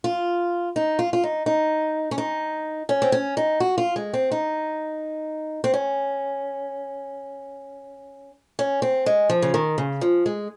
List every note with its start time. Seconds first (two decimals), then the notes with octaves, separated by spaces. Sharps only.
0.04 F4
0.76 D#4
0.99 F4
1.13 F4
1.23 D#4
1.46 D#4
2.11 C#4
2.18 D#4
2.89 C#4
3.02 C4
3.12 C#4
3.37 D#4
3.60 F#4
3.78 F4
3.96 G#3
4.13 C4
4.31 D#4
5.64 C4
5.74 C#4
8.59 C#4
8.82 C4
9.06 G#3
9.30 F3
9.42 C#3
9.54 D#3
9.78 C#3
10.01 F3
10.26 G#3